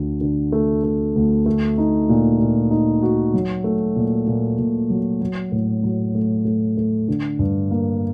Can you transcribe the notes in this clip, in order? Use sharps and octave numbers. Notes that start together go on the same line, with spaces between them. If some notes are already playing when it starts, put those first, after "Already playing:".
Already playing: D2 D3
D3
A3
A3
D2
A3
D#4
A#2
A#2
D#4
F#4
F#3
A3
A#2
A#2
A#2
F#3
F#3
A2
F#3
A3
A3
A3
D3
G2
A#3